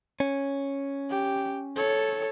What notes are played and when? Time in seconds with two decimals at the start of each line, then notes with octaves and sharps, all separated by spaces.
0.20 C#4
1.10 G4
1.76 A4 C#5